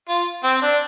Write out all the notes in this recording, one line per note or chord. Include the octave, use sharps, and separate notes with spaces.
F4
C4
D4